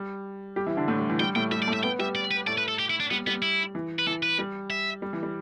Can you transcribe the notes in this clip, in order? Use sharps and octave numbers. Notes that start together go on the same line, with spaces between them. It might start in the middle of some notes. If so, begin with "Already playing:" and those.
Already playing: G3
G3 G4
E3 E4
D3 D4
A2 A3
G3
E3
G3 G5
A2 A3 G5
G3 E5
D5
A2 A3
E5
B3 B4 G5
G3 G4 E5
D5
B4
A2 A3 D5
B4
A4
G4
E4
D4
G3 B3
G3 B3
E4
E3
B4
E3 A4
B4
G3
E5
G3
E3
G3